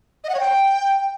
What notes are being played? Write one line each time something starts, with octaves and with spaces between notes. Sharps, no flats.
D#5
F#5
C#5
G5